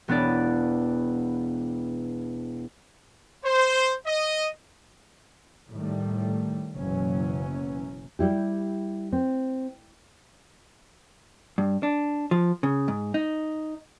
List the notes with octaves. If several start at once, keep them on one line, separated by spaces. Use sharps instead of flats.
E1 B3 D4 D5
C5
D#5
A2 D#3 G3 A3
F#1 B2 E3 F#3 C#4
G3 E4 G4
C4
G2
D4
F3
C#3
G#2
D#4